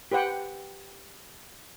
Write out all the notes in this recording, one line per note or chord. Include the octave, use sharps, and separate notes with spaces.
G4 B4 C5 F#5 G5